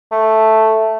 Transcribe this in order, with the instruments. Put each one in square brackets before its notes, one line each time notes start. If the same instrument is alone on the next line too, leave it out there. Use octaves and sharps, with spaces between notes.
[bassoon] A3